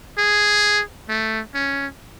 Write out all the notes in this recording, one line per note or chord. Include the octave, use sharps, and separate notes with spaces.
G#4
A3
C#4